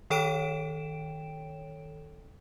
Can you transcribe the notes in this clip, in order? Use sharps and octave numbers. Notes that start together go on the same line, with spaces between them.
D#3 A4 C#5 G5 D7 E7